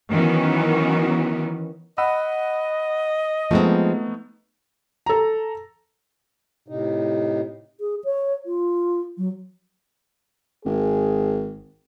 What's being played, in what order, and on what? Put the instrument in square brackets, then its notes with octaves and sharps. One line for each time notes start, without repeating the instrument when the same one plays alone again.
[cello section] D#3 E3 F#3 B3 C#4 F#4
[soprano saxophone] D#5 [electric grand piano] F#5 B5 E6
[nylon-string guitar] F3 G#3 C4 [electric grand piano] A3 B3 D#4
[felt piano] A4 A#5
[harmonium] A2 C3 D#4
[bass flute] G#4
C#5
F4
F#3
[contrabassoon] G#1 [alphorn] G#4